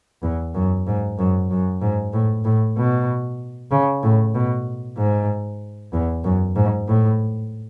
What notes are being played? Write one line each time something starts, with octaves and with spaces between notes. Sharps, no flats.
E2
F#2
G#2
F#2
F#2
G#2
A2
A2
B2
C#3
A2
B2
G#2
E2
F#2
G#2
A2